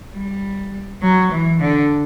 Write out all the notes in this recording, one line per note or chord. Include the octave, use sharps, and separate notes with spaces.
G3
F#3
E3
D3